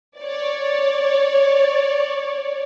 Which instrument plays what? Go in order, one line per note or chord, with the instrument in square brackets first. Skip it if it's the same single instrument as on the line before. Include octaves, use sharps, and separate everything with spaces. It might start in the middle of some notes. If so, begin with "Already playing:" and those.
[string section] C#5 D5